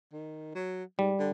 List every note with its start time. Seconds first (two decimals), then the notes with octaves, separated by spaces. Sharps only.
0.12 D#3
0.55 F#3
0.99 G#2 G3
1.18 D3